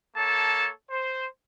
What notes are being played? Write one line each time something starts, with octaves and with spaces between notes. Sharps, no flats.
A#3 A4 C#5 A5
C5